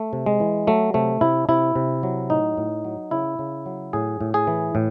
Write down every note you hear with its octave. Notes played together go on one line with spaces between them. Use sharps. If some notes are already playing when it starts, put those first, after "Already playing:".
Already playing: A3
C3
G#3
E3
F#3 A3
C3 A3
C3 E4
C3 E4
C3
F#3
A2 D#4
A2
F#3
C#3 E4
C#3
F#3
A2 G#4
A2
G#4
E3
A2